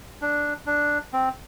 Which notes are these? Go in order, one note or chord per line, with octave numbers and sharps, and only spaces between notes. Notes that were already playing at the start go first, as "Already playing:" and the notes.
D4
D4
C4